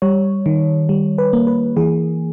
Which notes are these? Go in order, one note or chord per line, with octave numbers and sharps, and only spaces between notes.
G3 C#5
D#3
G3
B4
A#3
B4
E3 G#4